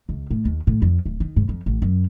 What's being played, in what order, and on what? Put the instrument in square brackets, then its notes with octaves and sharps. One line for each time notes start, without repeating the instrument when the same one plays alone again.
[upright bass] C#2
A2
D#2
A2
F2
D1
D#3
G#2
F2
A1
F#2